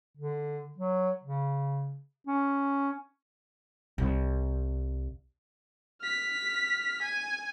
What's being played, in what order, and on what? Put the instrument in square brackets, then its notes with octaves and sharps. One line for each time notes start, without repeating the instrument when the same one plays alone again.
[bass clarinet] D3
F#3
C#3
C#4
[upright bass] C2
[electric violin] F6 B6
G#5